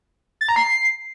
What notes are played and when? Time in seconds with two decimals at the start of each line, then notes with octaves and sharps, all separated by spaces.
0.41 A6
0.49 A#5
0.56 C7